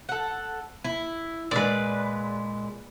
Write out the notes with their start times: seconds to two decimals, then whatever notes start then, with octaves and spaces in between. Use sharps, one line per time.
0.09 A4 F#5
0.84 E4
1.51 A#2 D#3 G#3 B4 D5